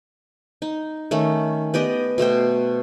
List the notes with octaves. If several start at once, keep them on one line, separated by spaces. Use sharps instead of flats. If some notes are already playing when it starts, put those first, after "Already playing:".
D#4
D#3 A3 C#4
B3 G4 D5 D#5
B2 A3 C5 G5